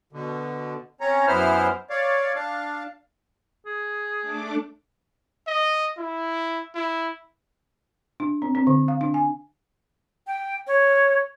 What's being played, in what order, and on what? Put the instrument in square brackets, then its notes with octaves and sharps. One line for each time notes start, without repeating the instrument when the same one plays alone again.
[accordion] B2 D3
C4 C#4 C#5 A#5
F#2 B3 E4 C5 F6
C#5 D5 F5
D4 F5
[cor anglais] G#4
[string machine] A3 D4 D6
[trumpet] D#5
E4
E4
[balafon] D4
C4
C4
D3
F5
D4
G#5
[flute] G5
C#5